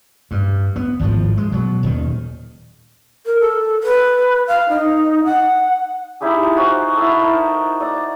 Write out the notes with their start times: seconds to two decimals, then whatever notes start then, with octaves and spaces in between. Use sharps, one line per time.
0.31 G2
0.76 B3
0.99 G#1 A2 C3 F3
1.37 G#3
1.52 B2 F#3
1.83 D#1 D#3
3.26 A#4
3.40 A4
3.83 B4
4.48 F5
4.69 D#4
5.25 F#5
6.21 D#4 E4 G4 G#4
6.42 F4
6.57 D#4 F#4 C5 F5
6.96 E4 A4
7.19 D#4 A#4 A5
7.80 D5 E5 A#5